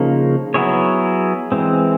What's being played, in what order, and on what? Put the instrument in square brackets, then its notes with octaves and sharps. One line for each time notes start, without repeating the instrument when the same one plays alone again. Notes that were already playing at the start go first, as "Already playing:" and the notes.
Already playing: [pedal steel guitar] C#3 F3 A#3 D#4
F#3 B3 E4 G#4 C#5
E3 G#3 C4